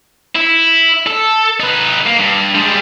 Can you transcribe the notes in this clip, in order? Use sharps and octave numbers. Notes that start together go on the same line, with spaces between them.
E4
A4
D#4 B4
A#3
G2
G3 G#3